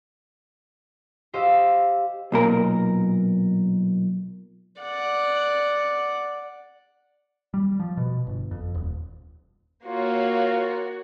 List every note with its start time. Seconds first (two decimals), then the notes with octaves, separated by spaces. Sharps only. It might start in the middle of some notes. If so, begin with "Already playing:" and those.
1.33 G4 C5 D#5 F5 E6
2.32 B1 A#2 A#4
4.79 D5 F#5
7.54 G3
7.80 F3
7.97 B2
8.27 G1
8.51 F2
8.74 D#1
9.88 A#3 F4 F#4 C#5